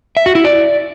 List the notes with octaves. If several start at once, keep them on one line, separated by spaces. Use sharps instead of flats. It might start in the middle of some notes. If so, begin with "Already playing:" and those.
E5
F#4
E4
D5